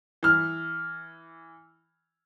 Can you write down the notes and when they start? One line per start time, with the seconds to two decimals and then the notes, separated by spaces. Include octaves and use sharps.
0.23 E3 F6